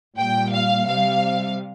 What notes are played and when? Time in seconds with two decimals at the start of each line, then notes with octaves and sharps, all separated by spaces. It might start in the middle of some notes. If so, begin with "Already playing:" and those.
0.19 A#2 G3 G5
0.53 F5
0.87 C3 G3 F5